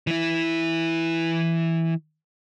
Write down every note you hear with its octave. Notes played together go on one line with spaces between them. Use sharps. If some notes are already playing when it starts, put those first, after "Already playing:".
E3 E4